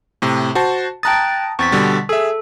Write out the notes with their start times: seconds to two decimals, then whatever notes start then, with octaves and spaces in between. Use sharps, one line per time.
0.22 A2 C3
0.55 F#4 C5 A5
1.03 G5 A5 A#5 D#6 F#6 A6
1.59 E2 C4 C#6 A6 B6
1.72 B2 D3 G3
2.09 G#4 A4 E5